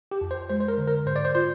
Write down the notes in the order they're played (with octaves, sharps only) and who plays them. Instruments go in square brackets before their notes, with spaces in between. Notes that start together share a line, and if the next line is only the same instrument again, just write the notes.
[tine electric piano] G4
[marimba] F2
[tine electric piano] C5
[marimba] G#3 [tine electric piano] C5
[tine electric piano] C5
A#4
[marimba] D3
[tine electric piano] A#4
[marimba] G#2 [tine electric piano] C5
[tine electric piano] D5
C5
[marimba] F4 [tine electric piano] C5